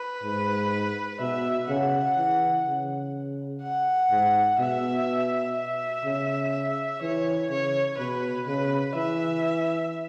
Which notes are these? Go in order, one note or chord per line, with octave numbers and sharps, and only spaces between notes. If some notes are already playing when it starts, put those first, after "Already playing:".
Already playing: B4
G#2
B2 E5
C#3 F#5
E3
C#3
F#5
G#2
B2 E5
E5
C#3
E3 C#5
C#3 C#5
B2 B4
C#3 B4
E3 E5